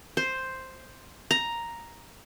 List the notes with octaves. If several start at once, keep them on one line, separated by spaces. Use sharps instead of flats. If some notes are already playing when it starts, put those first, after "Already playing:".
C5
A#5